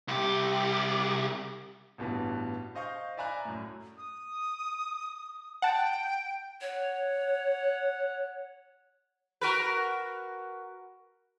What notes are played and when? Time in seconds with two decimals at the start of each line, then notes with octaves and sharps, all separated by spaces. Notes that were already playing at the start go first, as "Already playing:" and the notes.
0.08 C2 G4
1.98 A1 G2 B2 E3
2.75 C5 D#5 F5 C#6 G6
3.17 D5 E5 G#5 A#5 B5 F#6
3.45 F#2 A2
3.97 D#6
5.62 F#5 G5 A5
6.61 C#5 F#5
9.41 F#4 A#4 B4